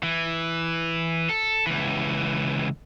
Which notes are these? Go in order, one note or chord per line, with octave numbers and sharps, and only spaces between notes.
E3
A4
C#2 E3